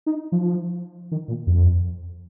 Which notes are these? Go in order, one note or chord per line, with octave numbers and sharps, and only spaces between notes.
D#4
F3
D#3
A#2
F2